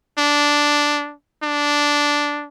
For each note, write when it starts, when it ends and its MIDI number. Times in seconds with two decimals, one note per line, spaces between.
0.18 1.13 62
1.43 2.46 62